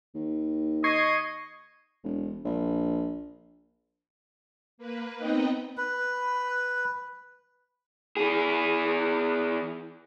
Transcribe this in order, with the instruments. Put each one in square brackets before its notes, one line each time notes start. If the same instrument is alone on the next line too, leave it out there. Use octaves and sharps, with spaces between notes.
[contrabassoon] D#2
[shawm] D#5 [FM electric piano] C#6 G#6 C7
[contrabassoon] E1
A#1
[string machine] A#3 B4
B3 C4 D#4 B4 D#5 G5
[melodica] B4
[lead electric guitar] E3 G#4